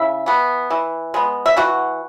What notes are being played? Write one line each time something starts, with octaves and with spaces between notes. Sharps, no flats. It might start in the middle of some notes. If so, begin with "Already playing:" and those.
Already playing: C#3 E4 E5
E3 B3
E3
G#3 B3
E5
E3 F#4 F#5